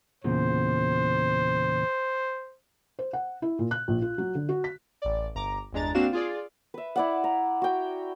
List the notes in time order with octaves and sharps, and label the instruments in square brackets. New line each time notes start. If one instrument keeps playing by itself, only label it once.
[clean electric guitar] E2 A#2 C#3 [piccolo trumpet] C5
[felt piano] C5
F#5
E4
A#2
F#6
A#1
F4
F#3
D3
F#4
B6
[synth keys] A1 D5
G1 A#5 D6
G1 E2 G#3 D4 A#5 A6
A#3 C4 D4 F#4 F5 E7
F4 G#4 D5
[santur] B4 E5
E4 D5 F#5
A#5
F#4 G5